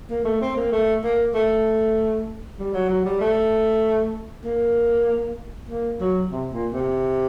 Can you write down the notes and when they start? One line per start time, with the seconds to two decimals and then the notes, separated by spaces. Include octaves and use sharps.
0.10 A#3
0.25 A3
0.41 C4
0.56 A#3
0.72 A3
1.03 A#3
1.34 A3
2.59 G3
2.74 F#3
2.89 F#3
3.05 G3
3.21 A3
4.44 A#3
5.69 A#3
6.00 F#3
6.31 C3
6.52 A#2
6.73 C3